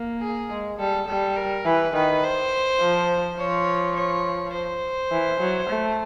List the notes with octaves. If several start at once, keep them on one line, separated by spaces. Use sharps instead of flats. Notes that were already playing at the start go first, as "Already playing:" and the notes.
Already playing: A#3
G#4
G#3
G3 A4
G3 A4
A#4
E3 B4
D#3 B4
C5
F3
F3 C#5
C#5
C5
E3
F#3
A3